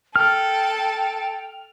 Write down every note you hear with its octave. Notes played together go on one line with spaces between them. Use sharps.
A4 G5 F6